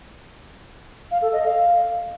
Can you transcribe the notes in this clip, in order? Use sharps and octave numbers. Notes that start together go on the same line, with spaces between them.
F5
A4
D#5
F5